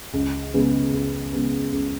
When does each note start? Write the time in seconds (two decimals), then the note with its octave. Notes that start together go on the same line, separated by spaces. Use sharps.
0.14 C#2
0.54 C#3 G#3 B3
0.94 C#2
1.33 C#3 G#3 B3
1.73 C#2